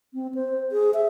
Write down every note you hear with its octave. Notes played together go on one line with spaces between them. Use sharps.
C4
C5
G#4
E5